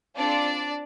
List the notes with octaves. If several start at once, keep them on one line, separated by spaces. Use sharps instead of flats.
C4 D4 F4 A4 D5